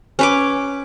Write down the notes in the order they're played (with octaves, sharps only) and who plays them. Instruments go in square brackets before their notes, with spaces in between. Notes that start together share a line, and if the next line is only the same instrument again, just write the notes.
[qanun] C#4 B4 D6